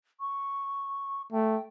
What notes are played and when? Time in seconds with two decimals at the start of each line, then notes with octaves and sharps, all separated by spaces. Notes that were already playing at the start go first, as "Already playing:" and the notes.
0.20 C#6
1.32 A3 G5